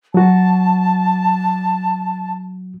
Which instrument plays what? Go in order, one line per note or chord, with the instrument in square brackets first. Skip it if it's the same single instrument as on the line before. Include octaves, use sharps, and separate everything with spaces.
[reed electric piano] F#3 F#4 [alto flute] A5